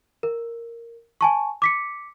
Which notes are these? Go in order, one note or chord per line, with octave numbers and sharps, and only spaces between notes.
A#4
G#5 A5 C#6
D6 B6 C#7